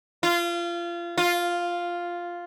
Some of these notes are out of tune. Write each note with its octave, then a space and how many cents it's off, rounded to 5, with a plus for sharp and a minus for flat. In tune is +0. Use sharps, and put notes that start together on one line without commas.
F4 -25
F4 +0